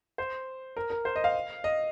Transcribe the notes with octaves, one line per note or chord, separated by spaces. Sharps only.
C5
A#4
A#4
C5
D#5
F5
D#5